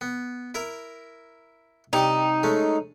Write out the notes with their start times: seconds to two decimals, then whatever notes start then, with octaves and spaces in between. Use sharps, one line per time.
0.01 B3
0.55 E4 A#4 A#5
1.93 C3 G3 D#4 D6
2.43 G#3 A3 C#4